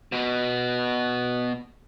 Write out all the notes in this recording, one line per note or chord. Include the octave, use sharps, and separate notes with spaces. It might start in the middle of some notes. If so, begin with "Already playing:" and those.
B2 B3